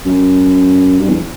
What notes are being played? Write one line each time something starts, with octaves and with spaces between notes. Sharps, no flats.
F#2
G2
E2